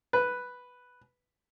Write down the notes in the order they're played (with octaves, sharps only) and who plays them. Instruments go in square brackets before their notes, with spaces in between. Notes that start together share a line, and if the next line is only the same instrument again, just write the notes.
[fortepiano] B4